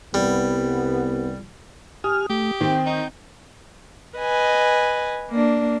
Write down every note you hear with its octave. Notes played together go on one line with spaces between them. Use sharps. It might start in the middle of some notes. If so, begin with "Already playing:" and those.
C2 G3 B3
G4 G#5 D#6 F6
A3 G4
D#3 C4 G5
D#4
B4 D#5 G#5
A#3 D4